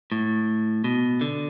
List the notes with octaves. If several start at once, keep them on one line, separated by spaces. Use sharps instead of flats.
A2
B2
D3